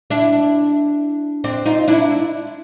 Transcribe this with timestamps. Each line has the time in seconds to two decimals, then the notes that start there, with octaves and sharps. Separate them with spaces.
0.10 D4 E4
1.44 C4 D4
1.66 D#4 F4
1.88 D4 E4